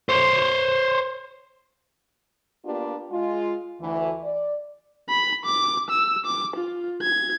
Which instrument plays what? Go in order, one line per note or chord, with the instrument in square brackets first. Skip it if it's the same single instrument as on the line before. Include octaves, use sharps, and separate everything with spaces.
[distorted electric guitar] C5 C#5
[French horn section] A#3 B3 D4 F4 G4
G#3 F4
D2 E3
D5
[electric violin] B5
D6
E6
D6
F4
G#6